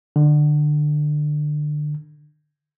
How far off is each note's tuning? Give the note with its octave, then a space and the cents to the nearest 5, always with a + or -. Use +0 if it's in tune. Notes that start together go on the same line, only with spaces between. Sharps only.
D3 +25